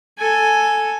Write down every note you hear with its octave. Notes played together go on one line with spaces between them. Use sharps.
A4 G#5